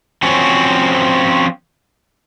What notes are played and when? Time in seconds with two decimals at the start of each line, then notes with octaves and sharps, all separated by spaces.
0.23 F3 C4 C#4 F#4